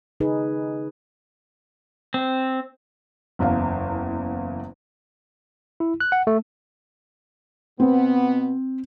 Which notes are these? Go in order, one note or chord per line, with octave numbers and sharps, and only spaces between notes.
C#3 D#4 G#4 B4
C4
F#1 E2 F5
E4
F#6
F#5
A3
B2 B3 C4